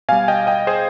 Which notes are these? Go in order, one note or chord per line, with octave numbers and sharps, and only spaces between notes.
B2 G3 F5 G#5
D#5 G5
D#5 G5
G#4 C5